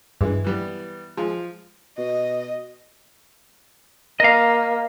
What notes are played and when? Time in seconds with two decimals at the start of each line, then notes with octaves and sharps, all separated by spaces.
0.21 G2 E3 G#3
0.44 E3 G3 B3
1.17 F3 G#3
1.98 B2 D#5
4.20 A#3 D#5 F5